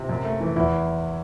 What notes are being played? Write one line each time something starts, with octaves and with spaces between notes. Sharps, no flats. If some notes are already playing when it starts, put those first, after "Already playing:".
Already playing: C3
F#2
A3
E3
E2 E4